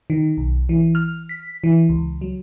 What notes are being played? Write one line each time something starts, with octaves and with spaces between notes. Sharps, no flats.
D#3
B1
E3
F6
B6
E3
C#2
F#3